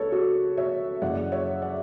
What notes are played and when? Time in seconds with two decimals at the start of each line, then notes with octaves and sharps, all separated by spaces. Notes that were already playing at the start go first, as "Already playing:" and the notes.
Already playing: C#2 D4 A4 B4 C#5
0.12 F#4 A4
0.57 C#5 E5
1.02 F#1 F#2 E3 G#3 D5 F#5
1.32 C#5 E5
1.62 D5 F#5